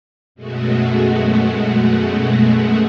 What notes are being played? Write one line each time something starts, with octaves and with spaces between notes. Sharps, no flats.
F#2 B2 G#3 A3 F#4